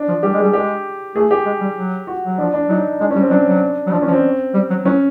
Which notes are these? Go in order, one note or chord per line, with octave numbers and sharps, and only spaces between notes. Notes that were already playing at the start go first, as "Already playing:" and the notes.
Already playing: D4
F3
G3 G4
G#3
G3 G#4
G#3 G4
A3 G#4
G4
G#3
G3
F#3
F#4
F#3
F3 D4
D4
F#3 D#4
G#3 D4
G3 C#4
C4
F#3 D4
F#3
F#3
F3 D4
C#4
F3
C4
G3
F#3
F#3 C#4